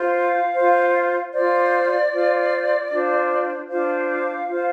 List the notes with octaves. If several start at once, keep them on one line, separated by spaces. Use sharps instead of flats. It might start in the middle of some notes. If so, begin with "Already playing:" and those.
Already playing: F4 C5
F5
F4 C5
F4 C5 D5
F4 C5
D4 F4 C5
D4 F4 C5 F5
F4 C5